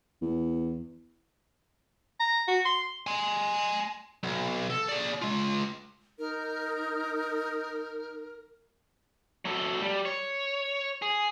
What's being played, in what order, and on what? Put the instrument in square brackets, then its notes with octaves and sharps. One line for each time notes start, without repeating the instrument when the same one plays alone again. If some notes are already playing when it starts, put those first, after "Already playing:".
[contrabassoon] E2
[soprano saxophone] A#5
F#4
C6
[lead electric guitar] G#5 C6
B1
A4
G#4 D5
G#3 F4
[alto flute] D#4 [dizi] A#4
[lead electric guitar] F#3 A4
G3
C#5
G#4